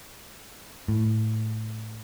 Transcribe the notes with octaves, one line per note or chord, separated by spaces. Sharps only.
A2